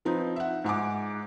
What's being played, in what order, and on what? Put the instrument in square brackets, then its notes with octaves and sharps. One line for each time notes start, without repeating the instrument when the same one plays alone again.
[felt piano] F3 C4 D#4 B4
E5 F#5
G#2 F#5 G#5 D6